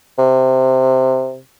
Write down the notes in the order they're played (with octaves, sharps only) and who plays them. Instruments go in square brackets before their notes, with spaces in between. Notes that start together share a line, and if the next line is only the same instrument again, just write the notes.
[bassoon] C3